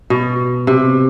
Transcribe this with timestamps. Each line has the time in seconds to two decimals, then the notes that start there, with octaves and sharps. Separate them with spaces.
0.10 B2
0.67 C3